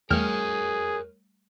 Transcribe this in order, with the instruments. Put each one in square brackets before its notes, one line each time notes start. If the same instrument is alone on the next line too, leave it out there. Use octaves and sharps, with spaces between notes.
[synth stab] E2 F6 [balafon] G3 A3 [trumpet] G#4 [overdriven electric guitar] A#4 C#5